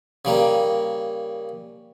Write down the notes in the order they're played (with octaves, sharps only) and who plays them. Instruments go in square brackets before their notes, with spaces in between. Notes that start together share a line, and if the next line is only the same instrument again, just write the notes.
[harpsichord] C#3 G3 A#3